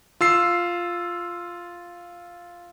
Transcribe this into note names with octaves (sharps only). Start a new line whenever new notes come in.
F4 E6 C7